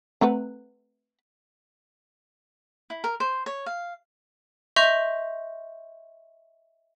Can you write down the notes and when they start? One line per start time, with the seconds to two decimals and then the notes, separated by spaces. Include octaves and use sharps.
0.21 A3 C4 B4 F#5 A#5
2.90 E4
3.04 A#4
3.20 C5
3.46 C#5
3.66 F5
4.76 D#5 E5 C6 C#6 G6 F7